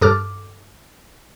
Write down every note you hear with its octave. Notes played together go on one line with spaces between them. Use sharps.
G2 A4 D6 F6